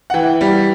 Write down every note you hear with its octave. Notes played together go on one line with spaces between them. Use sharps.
F#5
E3 G5
G3